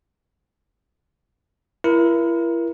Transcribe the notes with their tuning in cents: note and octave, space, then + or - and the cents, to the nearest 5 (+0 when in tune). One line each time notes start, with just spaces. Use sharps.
E4 +35 A#4 +30